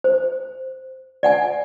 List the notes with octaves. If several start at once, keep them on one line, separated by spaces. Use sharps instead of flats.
C5
D5 F#5 G#5